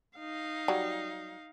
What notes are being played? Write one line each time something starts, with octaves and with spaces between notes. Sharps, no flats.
D#4 F5
F#3 G3